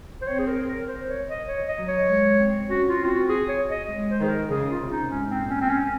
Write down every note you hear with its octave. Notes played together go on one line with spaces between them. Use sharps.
C5
C4 C#5
G#4
A#4
A#4
C5
C#5
D#5
C#5
D#5
F#3
C#5
G#3
C4
C#4 F#4
F4
C4
F4
F#4
G#4
C#5
D#5
G#3
C5
D#3 G#4
A#4
C#3 G#4
F4
C3
D#4
G#2 C#4
C4
A#2
C#4
C4
C#4